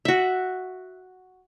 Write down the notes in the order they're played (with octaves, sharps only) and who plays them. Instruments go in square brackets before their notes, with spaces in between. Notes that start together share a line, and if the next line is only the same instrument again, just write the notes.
[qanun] F#4 E5